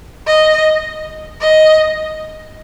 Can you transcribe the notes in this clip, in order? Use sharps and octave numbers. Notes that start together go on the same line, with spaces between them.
D#5
D#5